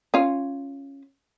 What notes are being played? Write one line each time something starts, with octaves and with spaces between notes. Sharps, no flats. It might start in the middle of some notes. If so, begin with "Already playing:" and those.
C#4 F4